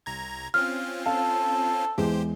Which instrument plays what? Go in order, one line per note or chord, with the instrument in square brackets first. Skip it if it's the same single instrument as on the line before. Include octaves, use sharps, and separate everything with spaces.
[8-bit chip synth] C2 A#5 G#6
[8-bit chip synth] C4 C#4 F4 [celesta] F6
[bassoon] A4 [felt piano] F5
[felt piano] E2 G#3 [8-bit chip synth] G4 C5